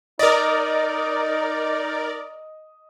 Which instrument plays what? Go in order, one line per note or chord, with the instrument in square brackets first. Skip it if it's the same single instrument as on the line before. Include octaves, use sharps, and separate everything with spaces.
[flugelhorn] D#4 [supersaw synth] A#4 D5 [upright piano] D#5